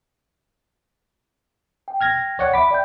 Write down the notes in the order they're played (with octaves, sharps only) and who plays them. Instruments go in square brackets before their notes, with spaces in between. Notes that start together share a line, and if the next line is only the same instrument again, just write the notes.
[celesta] G5
[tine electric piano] F6 G#6 A#6
C#5 D5 F#5
[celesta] E5 B5 [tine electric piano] D6 B6
[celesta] D5 G5 G6